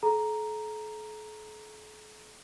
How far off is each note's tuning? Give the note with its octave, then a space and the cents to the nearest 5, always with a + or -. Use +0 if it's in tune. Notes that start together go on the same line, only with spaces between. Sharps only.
A4 -45 A#5 +0